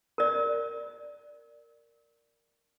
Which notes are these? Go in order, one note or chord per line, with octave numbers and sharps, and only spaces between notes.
A#4 D5